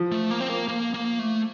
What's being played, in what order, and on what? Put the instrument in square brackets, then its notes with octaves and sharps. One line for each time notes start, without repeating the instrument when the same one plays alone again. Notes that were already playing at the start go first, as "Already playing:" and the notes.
Already playing: [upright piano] F3
[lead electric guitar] A3
A#3
C4
A#3
A#3
A#3
A3